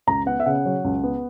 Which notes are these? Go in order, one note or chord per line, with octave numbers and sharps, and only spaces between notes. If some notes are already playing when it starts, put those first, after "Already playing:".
C#2 A#5
B3 F#5
E5
C#3 F#5
F#3
C#2
B3